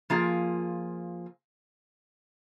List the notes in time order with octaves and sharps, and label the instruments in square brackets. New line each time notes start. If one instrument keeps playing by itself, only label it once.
[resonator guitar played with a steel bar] F3 A#3 F4 G#4